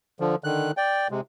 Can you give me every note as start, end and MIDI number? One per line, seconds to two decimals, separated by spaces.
0.20 0.36 50
0.20 0.36 53
0.44 0.71 50
0.44 0.71 51
0.44 0.71 90
0.77 1.08 74
0.77 1.08 79
1.11 1.21 48
1.11 1.21 56